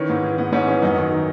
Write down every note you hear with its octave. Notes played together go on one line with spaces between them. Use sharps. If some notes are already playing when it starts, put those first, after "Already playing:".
Already playing: D#3 E3 C#4
G#2
E3
G#2 B3
G#2 C#4
E3 C#4
F#2 B3 D#4
D#3
D#3